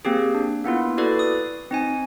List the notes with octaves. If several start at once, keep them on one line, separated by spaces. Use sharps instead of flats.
A#3 C4 G4 G#4
D4
A#3 B3 E4 F4
E4 F#4 A4 B4 D5
D#6
C4 D#4 G#5